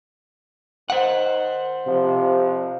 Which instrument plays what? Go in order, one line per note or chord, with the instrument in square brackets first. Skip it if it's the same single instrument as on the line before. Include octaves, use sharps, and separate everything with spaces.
[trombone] D#3 [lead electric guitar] C5 F#5
[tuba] C3 [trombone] F3